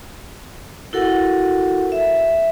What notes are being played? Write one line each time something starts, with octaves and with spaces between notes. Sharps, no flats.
E4 F#4 A4 A#4 F#5
E5